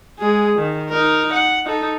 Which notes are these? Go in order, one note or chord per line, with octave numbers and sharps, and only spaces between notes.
G#3 G#4
D#3
D#4 A#4
F#5
D#4 A4